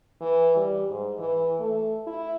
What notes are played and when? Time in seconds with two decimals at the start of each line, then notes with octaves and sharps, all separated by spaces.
0.21 E3
0.56 G3
0.90 G#2
1.19 E3
1.59 A3
2.07 E4